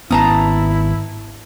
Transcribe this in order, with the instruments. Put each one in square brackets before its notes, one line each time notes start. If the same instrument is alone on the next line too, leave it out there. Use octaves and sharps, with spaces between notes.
[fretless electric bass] G#1 B3 C#4 [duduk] E4 [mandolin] A5 A#5 D#6